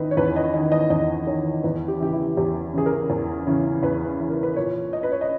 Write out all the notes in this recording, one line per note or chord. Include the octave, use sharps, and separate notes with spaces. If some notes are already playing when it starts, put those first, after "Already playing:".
Already playing: E2 D#3 B4 D#5 E5
C#5
E2 B4
D#5
D#3 D#5
D#5
E2 D#5
D#3 C#5
E2 B4
G4
C#3 E3 G4
E4
E2 G4
C#3 E3 G#4
A#4
E2
C#3 E3
E2 B4
C#3 E3
A#4
B4
A#2 C#5
D#5
B4
C#5
D#5